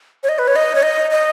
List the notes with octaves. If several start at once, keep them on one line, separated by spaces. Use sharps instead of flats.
C#5
D#5
B4
C#5
D#5
C#5
D#5
D#5